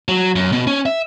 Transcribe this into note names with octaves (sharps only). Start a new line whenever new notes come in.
F#3
F#2
B2
C#4
E5